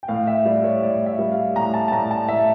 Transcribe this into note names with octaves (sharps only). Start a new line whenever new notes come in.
G5
A2 F5
E5
G3 D5
C#5
A2 D5
E5
G3
F5
A2 A#5
A5
A5
A2 A#5
A5
A2 E5